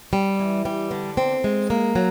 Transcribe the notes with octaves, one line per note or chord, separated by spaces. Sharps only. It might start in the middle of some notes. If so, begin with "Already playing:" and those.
G3
E3
G3
D3
C4
G#3
A#3
F#3